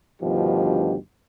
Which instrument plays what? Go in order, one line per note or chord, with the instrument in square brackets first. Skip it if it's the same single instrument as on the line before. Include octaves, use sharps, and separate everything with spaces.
[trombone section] D2 G2 B2 D#3 F3 G4